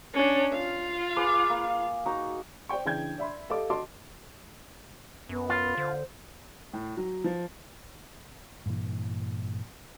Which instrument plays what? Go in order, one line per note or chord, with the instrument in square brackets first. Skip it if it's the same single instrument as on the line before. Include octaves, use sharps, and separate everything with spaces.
[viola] C#4 D4
F4 F5
[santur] G#4 B4 D6
A#3
D#4 F#4 A#5
[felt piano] C5 D5 G5 C#6
C#3 E3 D4 G5 G6 G#6
D5 E5 B5 C6
G4 A4 D#5 F5 D6
F#4 D#5 A5 C6 D6
[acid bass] F#2 [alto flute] B3
[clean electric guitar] F4
[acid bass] D3 [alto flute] C5
[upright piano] A2
F#3
F3
[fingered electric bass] G2 A#2 E3